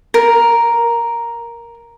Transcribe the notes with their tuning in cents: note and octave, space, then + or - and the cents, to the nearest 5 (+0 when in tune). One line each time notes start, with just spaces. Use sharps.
A#4 +5